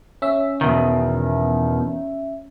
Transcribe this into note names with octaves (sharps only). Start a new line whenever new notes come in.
C#4 E5
E2 B2 D#3